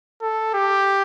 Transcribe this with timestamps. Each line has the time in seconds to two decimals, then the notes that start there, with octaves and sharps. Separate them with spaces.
0.22 A4
0.54 G4